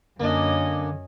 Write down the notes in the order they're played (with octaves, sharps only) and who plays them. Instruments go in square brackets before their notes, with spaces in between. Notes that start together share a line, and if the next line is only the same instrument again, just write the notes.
[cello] F#2 C#4 [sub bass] D3 [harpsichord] A#3 D4 [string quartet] D#5